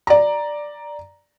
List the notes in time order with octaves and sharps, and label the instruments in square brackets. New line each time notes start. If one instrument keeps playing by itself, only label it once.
[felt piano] D5 A#5